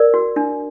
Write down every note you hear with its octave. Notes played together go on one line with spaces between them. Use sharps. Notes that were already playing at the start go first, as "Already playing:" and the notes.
Already playing: A#4 D5
F#4
D4